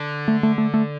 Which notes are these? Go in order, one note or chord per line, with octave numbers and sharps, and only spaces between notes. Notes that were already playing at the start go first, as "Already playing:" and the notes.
Already playing: D3
A3
A3
A3
A3